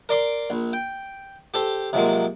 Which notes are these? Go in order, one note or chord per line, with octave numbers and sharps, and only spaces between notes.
A#4 D5 C6 D6
A#1
G5
G4 A4 C5
C3 F3 F#3 G#3 A#3